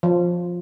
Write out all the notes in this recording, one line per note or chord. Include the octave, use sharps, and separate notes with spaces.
F3